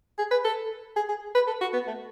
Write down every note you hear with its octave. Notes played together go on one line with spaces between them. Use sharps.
G#4
B4
A4
G#4
G#4
B4
A4
F#4
B3
A3